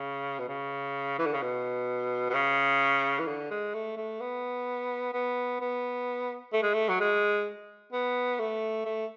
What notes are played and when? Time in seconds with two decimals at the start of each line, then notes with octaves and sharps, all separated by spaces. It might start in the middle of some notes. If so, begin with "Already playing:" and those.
Already playing: C#3
0.39 B2
0.48 C#3
1.19 E3
1.26 D3
1.34 C#3
1.42 B2
2.30 B2
2.34 C#3
3.19 E3
3.27 D3
3.51 G#3
3.74 A3
3.97 A3
4.21 B3
5.13 B3
5.61 B3
6.53 A3
6.63 G#3
6.74 A3
6.89 F#3
7.00 G#3
7.93 B3
8.39 A3
8.85 A3